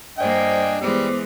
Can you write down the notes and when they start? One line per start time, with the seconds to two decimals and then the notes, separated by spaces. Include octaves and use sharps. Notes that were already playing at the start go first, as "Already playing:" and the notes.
0.18 G2 A#3 D4 C5 D5 D#5 G5 G#5
0.81 E3 G3 G#3 B3 C5 D6